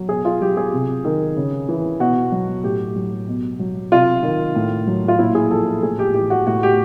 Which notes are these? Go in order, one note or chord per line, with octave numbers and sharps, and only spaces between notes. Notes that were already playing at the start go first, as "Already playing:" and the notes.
Already playing: F#3
B2 G#4
F4
F#3 G4
G#4
C3
D#3
C#3
E3
B2 F#4
F#3
A2 G4
F#3
B2
F#3
C3 F4
D#3
A2
F#3
F4
A#2 E4
G#4
F3 A4
A4
A2 G#4
G4
E3 G4
F#4
A2 F#4
G4